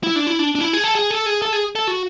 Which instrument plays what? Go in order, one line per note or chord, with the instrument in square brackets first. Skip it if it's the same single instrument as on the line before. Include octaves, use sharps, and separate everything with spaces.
[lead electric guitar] E4
D4
E4
D4
D4
E4
G#4
A4
G#4
A4
G#4
A4
G#4
A4
F#4